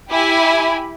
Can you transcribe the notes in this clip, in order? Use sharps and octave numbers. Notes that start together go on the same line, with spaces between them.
E4 G4 G#5 B5